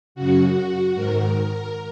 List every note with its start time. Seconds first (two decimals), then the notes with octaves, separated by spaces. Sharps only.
0.15 F#2 C#3 F#4
0.94 G#2 D#3 A#4